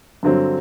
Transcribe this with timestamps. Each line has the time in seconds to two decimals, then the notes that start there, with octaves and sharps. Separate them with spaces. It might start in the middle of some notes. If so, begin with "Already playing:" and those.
0.23 G2 D3 F#3 C4